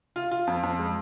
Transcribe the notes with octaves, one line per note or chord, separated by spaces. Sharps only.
F4
F4
F2
F2
G#3